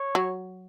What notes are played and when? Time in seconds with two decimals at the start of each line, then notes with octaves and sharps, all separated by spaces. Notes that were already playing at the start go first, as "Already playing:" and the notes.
Already playing: C#5
0.15 F#3